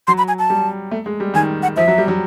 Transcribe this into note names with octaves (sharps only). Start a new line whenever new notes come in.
F#3 C6
B5
G#5
A5
G3
A3
G#3
G3
D#3 G#5
F#5
F3 E5
F#3
G3
F#3